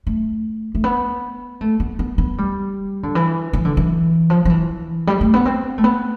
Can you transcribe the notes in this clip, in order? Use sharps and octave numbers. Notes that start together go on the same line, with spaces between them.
A3
A3
B3
A3
B3
B3
B3
G3
D3
E3
E3
D3
E3
F3
F3
E3
G3
A3
B3
C4
A3
B3